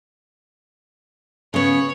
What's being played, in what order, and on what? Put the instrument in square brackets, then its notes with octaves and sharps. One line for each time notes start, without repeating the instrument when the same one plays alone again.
[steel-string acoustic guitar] C#3 B3 [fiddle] C#5